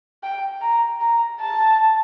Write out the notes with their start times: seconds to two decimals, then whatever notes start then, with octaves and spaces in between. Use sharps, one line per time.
0.23 G5
0.61 A#5
1.00 A#5
1.40 A5